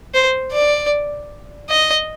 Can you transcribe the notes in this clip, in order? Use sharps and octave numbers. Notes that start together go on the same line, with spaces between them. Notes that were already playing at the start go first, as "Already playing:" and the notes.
C5
D5
D#5